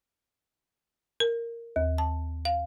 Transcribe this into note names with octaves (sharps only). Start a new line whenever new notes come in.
A#4
D#2
A5
F5